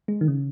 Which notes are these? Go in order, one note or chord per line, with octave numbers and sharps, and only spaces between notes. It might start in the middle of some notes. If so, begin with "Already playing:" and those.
G#3
D#3
C#3